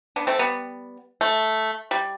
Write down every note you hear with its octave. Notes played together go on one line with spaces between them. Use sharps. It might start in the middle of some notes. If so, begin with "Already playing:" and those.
B3 D4
A3 C4
G3 B3
A3
G3